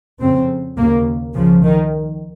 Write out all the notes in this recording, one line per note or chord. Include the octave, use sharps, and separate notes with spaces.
F2 C#3 C4
D#2 C#3 A#3
C#2 C#3 F3
D#3